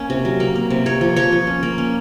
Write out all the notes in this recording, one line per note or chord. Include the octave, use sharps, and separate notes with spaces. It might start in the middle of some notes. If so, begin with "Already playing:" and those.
Already playing: A#3 C#4
C3
F#3
A#3
A#3
C3
A#3 C#5
F3
F3 C#5
F3
C#4
A#3
C#4